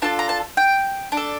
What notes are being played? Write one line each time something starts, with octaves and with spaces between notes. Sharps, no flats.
D4 F4 A4 A5
A#5
A5
G5
D4
A4